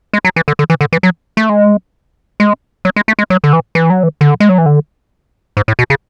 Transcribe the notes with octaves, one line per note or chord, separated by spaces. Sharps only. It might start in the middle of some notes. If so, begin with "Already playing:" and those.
G#3
F#3
E3
D3
D3
E3
D3
E3
F#3
A3
G#3
G#3
F#3
G#3
A3
G#3
F#3
D3
E3
E3
F#3
E3
D3
G#3
F#3
E3
D3
G#2
A2
B2
C#3